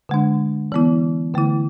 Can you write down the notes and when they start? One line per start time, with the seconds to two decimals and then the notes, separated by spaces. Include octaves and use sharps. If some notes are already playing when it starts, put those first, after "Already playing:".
0.09 D3 G#3 D4
0.72 E3 B3 E4
1.34 D3 A3 E4